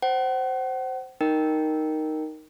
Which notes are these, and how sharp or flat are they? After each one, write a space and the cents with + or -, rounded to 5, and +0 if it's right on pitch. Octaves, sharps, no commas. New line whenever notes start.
C5 +0 F#5 +35
D#4 +0 A#4 +0 G5 +0